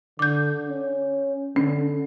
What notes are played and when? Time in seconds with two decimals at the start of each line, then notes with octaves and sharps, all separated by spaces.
0.19 D3 D6 G6
0.69 C#4
1.56 D3 C#4